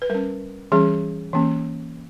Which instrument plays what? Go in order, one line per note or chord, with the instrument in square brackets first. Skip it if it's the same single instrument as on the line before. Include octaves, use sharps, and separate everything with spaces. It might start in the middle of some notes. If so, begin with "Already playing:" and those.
[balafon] B4
G3 C#4 A#4
E3 G3 C#4 G#4
E3 A#3 C#4